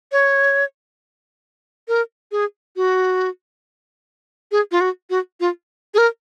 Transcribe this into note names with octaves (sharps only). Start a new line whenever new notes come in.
C#5
A#4
G#4
F#4
G#4
F4
F#4
F#4
F4
G#4
A#4